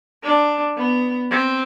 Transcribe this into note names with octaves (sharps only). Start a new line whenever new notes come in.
D4
B3
C4